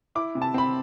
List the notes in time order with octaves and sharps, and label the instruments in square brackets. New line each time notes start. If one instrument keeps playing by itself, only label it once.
[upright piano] E4 D6
C3
A5
C4 B5